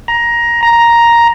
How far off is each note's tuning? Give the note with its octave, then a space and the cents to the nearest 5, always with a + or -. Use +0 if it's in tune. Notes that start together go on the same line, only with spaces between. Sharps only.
A#5 +15
A#5 +5